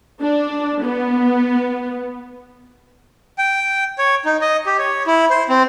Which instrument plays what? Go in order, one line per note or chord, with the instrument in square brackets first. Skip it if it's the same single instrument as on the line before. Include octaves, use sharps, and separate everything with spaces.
[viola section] D4
B3
[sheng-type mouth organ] G5
C#5
D#4
D#5
G4
C#5
E4
C5
C4